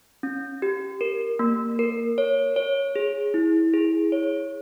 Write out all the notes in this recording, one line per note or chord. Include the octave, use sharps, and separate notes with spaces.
C#4
G4
A#4
A#3
A#4
C#5
C#5
G#4
E4
G#4
C#5